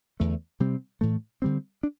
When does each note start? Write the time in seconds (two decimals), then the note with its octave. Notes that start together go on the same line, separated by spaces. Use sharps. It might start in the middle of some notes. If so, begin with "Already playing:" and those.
0.20 E2 D3 A3
0.60 C3 G3 C4
1.01 A2 E3 A3
1.42 D3 G3 C4
1.83 D4